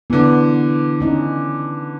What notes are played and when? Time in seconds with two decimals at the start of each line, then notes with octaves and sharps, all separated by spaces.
0.10 D3 E3 B3
1.01 C#4 D#4